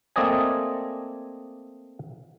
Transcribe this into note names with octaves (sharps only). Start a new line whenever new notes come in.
A3 A#3 C4 D5 D#5 G#5